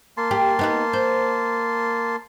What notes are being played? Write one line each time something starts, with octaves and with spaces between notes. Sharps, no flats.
A#3 A5 C6
G4
B3 D#4 B4
C5